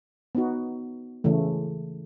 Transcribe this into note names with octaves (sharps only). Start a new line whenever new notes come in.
B3 D#4 F#4
C#3 E3 A3